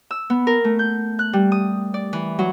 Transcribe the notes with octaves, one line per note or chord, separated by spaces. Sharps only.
E6
B3
A#4
A3
G6
F#6
G3
D#6
D5
E3
F#3